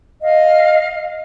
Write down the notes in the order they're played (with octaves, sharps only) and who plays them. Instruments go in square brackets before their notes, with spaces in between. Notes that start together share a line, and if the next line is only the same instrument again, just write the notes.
[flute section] D#5 F5